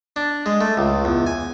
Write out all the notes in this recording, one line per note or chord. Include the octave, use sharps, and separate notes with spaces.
D4
G#3
A3
C#2
E2
G#5